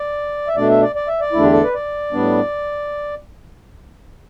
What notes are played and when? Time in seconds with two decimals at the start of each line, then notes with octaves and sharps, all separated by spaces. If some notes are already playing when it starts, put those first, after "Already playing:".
Already playing: D5
0.48 E5
0.56 B2 A3 D4 D5
0.69 E5
0.82 D5
0.96 D5
1.08 E5
1.21 D5
1.32 E2 D3 A3 D4 E4
1.42 G4
1.53 A4
1.63 B4
1.74 D5
2.13 A2 G3 B3 D4